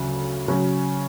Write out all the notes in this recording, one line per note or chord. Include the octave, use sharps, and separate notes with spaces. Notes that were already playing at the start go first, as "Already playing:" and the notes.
Already playing: D2 C#3 F#3
C#3 F#3 C#4